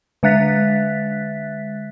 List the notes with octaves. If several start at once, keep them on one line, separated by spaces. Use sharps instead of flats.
D3 G#3 E5 F#6 A6 B6